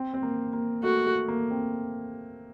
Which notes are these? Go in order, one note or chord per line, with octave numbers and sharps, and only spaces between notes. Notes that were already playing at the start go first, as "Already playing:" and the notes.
Already playing: C4
C4
A#3
A#3
A3 F#4
A3
A#3
C4